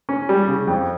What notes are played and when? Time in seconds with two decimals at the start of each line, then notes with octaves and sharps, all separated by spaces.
0.09 C#4
0.29 G3
0.47 C#3
0.67 F2